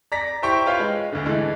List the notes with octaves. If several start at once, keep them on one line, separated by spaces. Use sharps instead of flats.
D5 A#5 A#6 B6
E4 G4 C5 G5 C#6
F4 B4 C#5 F5 G5
G#3
D2 D3
D3 E3 G#3 A3